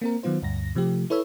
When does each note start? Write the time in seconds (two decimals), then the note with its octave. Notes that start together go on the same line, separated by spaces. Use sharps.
0.01 A#3 C4 A#4
0.23 D#3 F#3 B3 F4 C5
0.42 D2 G2 A#6
0.75 C3 F3 A3 G4
1.10 E4 A4 B4 C#5 B5 E6